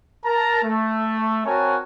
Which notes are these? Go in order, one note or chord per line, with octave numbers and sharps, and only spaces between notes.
A#4 A5 A#5
A3
C4 F#4 A#4 C#5 G#5 A5